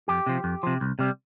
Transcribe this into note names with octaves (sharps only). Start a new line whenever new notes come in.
F2 G4
C3 F3
F2
C3 F3
C2
C3 G3